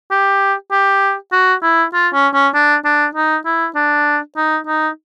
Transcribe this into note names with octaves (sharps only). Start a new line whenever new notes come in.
G4
G4
F#4
E4
F4
C#4
C#4
D4
D4
D#4
E4
D4
D#4
D#4